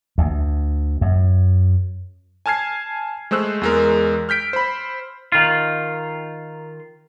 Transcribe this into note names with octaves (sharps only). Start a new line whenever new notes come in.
D2
F#2
G#5 A5 F6 G#6 C7
G#3 A3 C5 E6 F#6
E2 G#3 A#4
F6 G6 B6 D7
C5 B5
D#3 F4